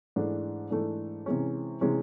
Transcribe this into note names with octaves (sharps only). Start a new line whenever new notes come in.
G#2 E3 A3 D4
G#2 E3 A3 D4
C3 E3 G#3 C#4
C3 E3 G#3 C#4